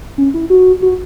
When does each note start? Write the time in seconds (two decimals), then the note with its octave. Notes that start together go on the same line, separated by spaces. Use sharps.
0.18 C#4
0.34 E4
0.50 F#4
0.82 F#4